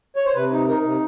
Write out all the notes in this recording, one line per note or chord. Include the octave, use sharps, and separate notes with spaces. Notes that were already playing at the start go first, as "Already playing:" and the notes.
C#5
C5
C3 B4
D#4
D#4 A#4
C3